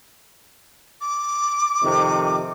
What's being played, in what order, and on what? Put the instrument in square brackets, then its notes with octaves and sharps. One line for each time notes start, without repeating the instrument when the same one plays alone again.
[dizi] D6
[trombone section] F2 C3 D#3